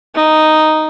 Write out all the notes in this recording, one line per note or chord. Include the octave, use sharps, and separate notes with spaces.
D#4